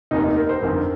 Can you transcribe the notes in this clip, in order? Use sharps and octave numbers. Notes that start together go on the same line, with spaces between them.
F1 D#2 D#3 D#4
D#4
A#4
C5
G1 F2 D#3 A#4